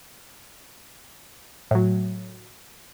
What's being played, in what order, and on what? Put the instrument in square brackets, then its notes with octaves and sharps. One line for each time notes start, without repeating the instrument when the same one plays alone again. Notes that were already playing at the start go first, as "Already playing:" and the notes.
[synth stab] A2 F#3